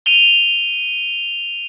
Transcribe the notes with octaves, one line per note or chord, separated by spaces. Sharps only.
D#7 F7 G7